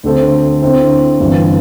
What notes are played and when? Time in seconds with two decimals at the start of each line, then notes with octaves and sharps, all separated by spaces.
0.03 D2 D3 C4 A4 C5
0.62 D3 C4 E4 C5
1.20 G1 G2 E3 C4